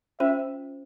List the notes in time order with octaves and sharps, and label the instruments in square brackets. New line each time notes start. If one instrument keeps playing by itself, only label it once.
[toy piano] C#4 F4 C5 [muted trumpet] E5